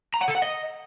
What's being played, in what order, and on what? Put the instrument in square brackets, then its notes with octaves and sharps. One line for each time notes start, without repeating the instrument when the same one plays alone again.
[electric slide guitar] A#5
F#5
A4
F#5
D#5